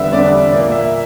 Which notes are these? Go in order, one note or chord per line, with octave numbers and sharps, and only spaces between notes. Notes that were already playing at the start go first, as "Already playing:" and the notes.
Already playing: E2 D3 G3 B3 E5
E2 D3 G3 B3 D5
A#2 A#3 D5
E5